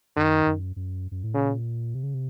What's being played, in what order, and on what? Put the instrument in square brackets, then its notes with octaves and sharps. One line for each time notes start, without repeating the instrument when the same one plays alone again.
[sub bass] F#2 [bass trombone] D#3
[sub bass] F#2
F#2
F#2
A2
[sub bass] A#2 [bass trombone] C#3
[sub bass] C3
C#3
C3